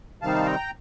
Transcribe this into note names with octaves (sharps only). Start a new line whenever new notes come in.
C3 D#3 G3 C4 D#4 F5 A5
G5 A#5